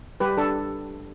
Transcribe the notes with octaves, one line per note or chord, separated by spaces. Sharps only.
G3 G4 B4
D4 A4